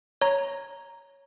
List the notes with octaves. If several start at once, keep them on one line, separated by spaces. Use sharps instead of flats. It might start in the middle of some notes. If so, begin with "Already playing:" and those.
C#5 A#5